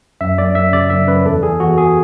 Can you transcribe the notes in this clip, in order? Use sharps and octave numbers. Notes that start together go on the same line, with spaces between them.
F#2 E5
F#2 D5
F#2 E5
C#3 D5
F#2 E5
F#2 B4
E2 A4
E2 G#4
E2 F#4
E2 G#4